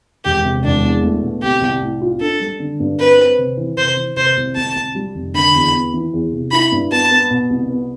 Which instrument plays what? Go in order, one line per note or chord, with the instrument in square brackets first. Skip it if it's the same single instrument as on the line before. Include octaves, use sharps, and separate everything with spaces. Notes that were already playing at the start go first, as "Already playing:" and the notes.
[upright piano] E1 [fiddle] G4
[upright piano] C3
[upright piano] E1 [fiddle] D4
[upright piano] E2
A3
B2
[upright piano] C2 [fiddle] G4
[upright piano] C2
A2
F4
[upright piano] D4 [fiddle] A4
[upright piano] G3
D3
G2
[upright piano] C4 [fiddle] B4
[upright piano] C4
C3
E3
[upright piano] C3 [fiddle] C5
[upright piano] E3
[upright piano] C3 [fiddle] C5
[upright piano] C2
[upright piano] C2 [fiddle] A5
[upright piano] C2
G3
F1
[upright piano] D3 [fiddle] B5
[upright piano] E2
B3
E3
E2
C3
[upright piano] E4 [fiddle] B5
[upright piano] G2
[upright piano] B3 [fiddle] A5
[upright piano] B3
B2
C2
B3